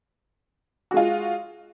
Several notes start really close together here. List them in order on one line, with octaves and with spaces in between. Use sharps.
F#4 G#3 F4